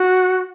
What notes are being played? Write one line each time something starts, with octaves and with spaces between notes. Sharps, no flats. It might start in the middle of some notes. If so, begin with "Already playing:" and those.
Already playing: F#4